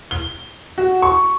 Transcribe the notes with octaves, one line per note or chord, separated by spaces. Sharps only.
G7
F#4
C#6